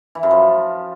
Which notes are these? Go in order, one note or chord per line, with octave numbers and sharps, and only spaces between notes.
E3
F#2
F3